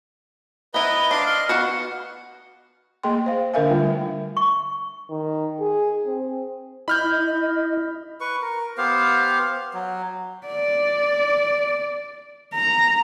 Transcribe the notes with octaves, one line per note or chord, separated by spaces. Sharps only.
B3 E4 B4 D#5 A#5 G7
D4 F5 C6 D6
D#5 C6 F6
B3 F#4 F5 F#5 C#7
A3 A#3 G#4 D#5 G5 C6
C5 F5
D3 D4 A#4 E5 F5 G#5
D3 G3 A3 F4
D3 G3
C#6
D#3
G#4
C4
E4 D#5 B5 F6 G6
B4 C#6
A#4
B3 G4 C5 F5
F#3
D5
A#5